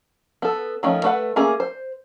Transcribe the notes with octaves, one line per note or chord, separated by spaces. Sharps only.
B3 A4
D#3 F3 A3 C#4
A3 B4 F#5
A3 A#3 C#4 G#4
C5